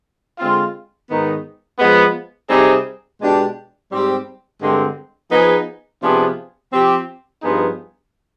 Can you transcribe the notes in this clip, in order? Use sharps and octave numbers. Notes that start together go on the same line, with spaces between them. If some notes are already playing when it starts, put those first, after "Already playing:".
D3 G#3 C4 F4
G#2 D#3 B3 D#4
F3 G#3 B3
C3 G3 C4 D#4 G#4
B2 G#3 D4 G4
G#2 G3 C4 G4
G2 D3 G#3 C4
F3 B3 D#4 G#4
C3 F3 B3 D4 G#4
F3 C4 G4
G2 F3 B3 D#4 G#4